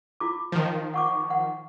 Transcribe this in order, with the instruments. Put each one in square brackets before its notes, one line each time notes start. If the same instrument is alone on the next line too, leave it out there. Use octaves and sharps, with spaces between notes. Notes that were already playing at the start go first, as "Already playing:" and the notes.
[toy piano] E4 F4 D6
[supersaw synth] D#3 F3
[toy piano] F#5 C#6 D6
F#5